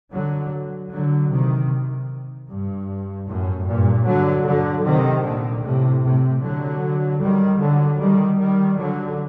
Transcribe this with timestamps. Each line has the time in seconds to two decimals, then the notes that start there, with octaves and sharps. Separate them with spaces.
0.12 D3 F#3
0.90 D3 F#3
1.30 C3 D#3
2.48 G2
3.27 F#2 A2
3.66 G2 A#2
4.06 D3 F#3
4.45 D3 F#3
4.84 C3 D#3
5.23 A#2 D3
5.63 A2 C3
6.03 A2 C3
6.42 D3 F#3
7.20 D#3 G3
7.59 D3 F#3
8.00 D#3 G3
8.39 D#3 G3
8.78 D3 F#3